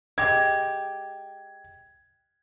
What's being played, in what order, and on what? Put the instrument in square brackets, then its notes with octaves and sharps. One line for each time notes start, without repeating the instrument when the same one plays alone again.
[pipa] G#3 G4 [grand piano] G#6